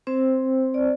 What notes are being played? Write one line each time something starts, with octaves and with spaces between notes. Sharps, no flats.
C4 C5
D5